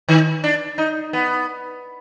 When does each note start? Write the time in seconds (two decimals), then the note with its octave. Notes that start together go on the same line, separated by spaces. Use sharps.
0.08 D#3
0.44 D4
0.78 D#4
1.13 B3